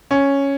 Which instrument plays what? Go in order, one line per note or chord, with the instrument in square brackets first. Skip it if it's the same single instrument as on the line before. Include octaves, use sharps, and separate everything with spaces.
[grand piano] C#4